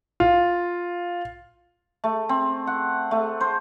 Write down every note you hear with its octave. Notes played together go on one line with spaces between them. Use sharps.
F4
A3
C4
F#5
A3
C5